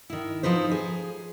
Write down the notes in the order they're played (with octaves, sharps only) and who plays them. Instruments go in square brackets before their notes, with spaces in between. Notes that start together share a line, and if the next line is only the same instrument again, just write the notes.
[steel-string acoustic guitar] D#3 E4
F3 D#4 B4 C5
G#4